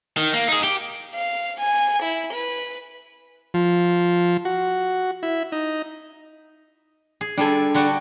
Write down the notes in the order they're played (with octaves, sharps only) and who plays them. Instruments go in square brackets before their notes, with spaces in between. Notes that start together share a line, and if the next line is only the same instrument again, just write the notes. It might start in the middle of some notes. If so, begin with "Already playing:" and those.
[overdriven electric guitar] D#3
A#3
D#4 G#4
G4
[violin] F5
G#5
E4
B4
[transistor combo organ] F3
F#4
E4
D#4
[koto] G#4
[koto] G3 G#4 G#5 [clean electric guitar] D4 A4
[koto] D3 G3 F#4